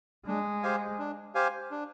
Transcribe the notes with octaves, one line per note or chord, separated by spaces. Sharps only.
G#3 D4
G4 C5 F5 G#5
D4
G4 C5 F5 G#5
D4